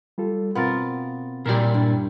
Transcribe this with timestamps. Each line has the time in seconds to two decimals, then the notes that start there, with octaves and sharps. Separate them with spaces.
0.18 G3 F4 A4
0.55 B2 B3 C4 F4 A#4 A6
1.45 A#2 G3 E4 A#4 D5
1.74 G2